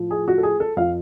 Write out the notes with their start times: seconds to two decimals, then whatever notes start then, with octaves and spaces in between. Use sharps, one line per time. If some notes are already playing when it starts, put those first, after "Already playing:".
Already playing: A2 F3
0.11 G#4
0.28 F#4
0.38 A4
0.43 G#4
0.60 A4
0.76 F2 F3 F5